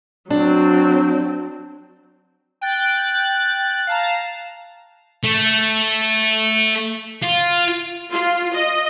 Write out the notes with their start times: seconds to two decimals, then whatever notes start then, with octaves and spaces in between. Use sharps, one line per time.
0.30 F#3 C4 D4
2.61 G5 F#6 A6
3.87 F5 A5 A#5
5.24 A3
7.22 F4
8.12 F4
8.54 D#5